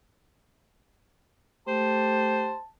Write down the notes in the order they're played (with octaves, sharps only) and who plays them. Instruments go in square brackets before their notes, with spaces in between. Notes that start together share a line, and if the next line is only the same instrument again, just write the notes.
[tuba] A3 [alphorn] G4 [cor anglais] C5 [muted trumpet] A5